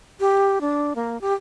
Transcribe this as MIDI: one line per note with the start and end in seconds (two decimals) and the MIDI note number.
0.20 0.59 67
0.61 0.93 62
0.96 1.20 58
1.21 1.33 67